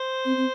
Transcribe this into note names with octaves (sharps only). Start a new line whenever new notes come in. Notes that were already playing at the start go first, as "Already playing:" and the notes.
Already playing: C5
C4
C4